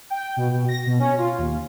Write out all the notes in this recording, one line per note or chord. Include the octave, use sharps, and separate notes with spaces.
G5
B2
B2
A#6
B2
C#4
F4
D#2